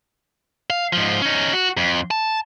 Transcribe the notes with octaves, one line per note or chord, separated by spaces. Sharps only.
F5
G#2 F3
C#4 D#4
F#4
F2
A5